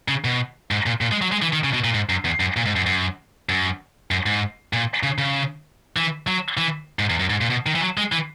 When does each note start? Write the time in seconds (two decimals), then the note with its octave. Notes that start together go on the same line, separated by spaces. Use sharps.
0.08 C#3
0.24 B2
0.71 G#2
0.86 A#2
1.01 A#2
1.12 G#3
1.21 F#3
1.32 G#3
1.42 E3
1.53 D#3
1.64 C#3
1.74 B2
1.84 A#2
1.94 G#2
2.09 F#2
2.25 E2
2.40 F#2
2.57 A#2
2.66 G#2
2.76 F#2
2.86 F#2
3.49 F#2
4.11 F#2
4.26 G#2
4.73 A#2
5.03 C#3
5.18 C#3
5.97 E3
6.27 F#3
6.57 E3
6.99 G#2
7.10 E2
7.19 F#2
7.30 G#2
7.41 A#2
7.50 B2
7.66 D#3
7.75 E3
7.81 F#3
7.98 G#3
8.12 E3